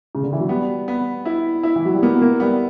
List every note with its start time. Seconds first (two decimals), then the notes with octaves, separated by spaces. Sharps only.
0.15 C#3
0.23 D3
0.33 E3
0.40 F#3
0.48 G3 B3
0.88 B3
1.25 E4
1.63 E4
1.76 E3
1.85 F#3
1.94 G3
2.03 A#3 B3
2.22 A#3
2.40 G3 B3